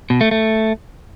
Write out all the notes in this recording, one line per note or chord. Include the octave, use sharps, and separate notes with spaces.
B2
A3
A3